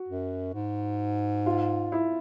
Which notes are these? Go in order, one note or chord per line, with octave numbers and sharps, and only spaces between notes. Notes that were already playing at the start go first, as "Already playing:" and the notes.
Already playing: F#4
F#2
G#2
F4
E4